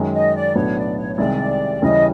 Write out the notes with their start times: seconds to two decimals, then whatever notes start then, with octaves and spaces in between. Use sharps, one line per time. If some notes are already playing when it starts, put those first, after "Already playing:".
Already playing: F#2 D#3 G#3
0.13 D#5
0.35 D5
0.55 B1 A2 F#3 B3 D4 C#5
0.77 D5
0.97 C#5
1.13 C#5
1.18 C2 C3 D#3 G#3 D5
1.82 D#2 C#3 E3 G3 D#5